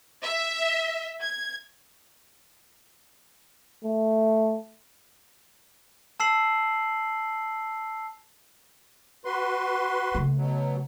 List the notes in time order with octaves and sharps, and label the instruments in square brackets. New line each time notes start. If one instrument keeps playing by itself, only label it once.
[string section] E5
G#6
[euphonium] A3
[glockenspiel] A5 E6 C7 F#7
[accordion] F#4 B4 C6
[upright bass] C#3 A3
[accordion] B2 F#3